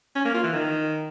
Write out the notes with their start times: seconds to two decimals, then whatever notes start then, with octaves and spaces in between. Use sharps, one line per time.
0.16 C#4
0.25 A#3
0.34 F4
0.44 E3
0.53 D#3